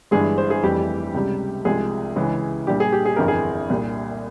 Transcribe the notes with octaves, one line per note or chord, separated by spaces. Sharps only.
G1 G2 E3 G#3 G#4
C5
G#4
F1 F2 E3 G3 G4
C#2 C3 G3
C2 C3 F3 G#3 G#4
C#2 C#3 E3 G#3
A#1 A#2 G3 G4
G#4
G4
G#4
G1 F2 E3 A#4
G#4
C2 A#2 G3